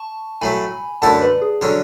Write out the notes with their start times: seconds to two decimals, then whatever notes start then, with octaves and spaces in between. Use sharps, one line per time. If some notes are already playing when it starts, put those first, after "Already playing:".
Already playing: A5 C#6
0.41 A2 F#3 A3 G#5 B5
1.02 F#2 D3 A3 E4 A4 F#5 A5
1.22 B4 D5
1.42 G#4
1.61 D3 F#3 C#4 A4